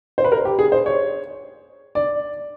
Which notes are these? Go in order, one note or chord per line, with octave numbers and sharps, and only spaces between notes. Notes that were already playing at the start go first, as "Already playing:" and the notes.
C5
B4
A#4
G4
G#4
C5
C#5
D5